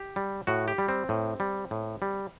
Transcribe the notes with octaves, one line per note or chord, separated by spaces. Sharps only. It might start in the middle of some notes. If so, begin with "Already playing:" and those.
Already playing: G4
G3
A2 F#4
G4
G3
C4
A2
G3
A2
G3